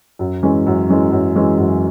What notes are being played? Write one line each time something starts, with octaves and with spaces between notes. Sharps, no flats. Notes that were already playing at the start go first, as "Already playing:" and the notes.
F#2
E3 G#3 C#4
F#2
E3 G#3 C#4
F#2
E3 G#3 C#4
F#2